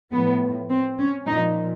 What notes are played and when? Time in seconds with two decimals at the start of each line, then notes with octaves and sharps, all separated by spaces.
0.11 A2 F3 B3
0.70 C4
0.98 C#4
1.27 A#2 F3 D#4